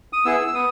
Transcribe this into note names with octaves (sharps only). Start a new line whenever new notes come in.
D#6
B3 E4 G#4 E6
E6
B3 D#6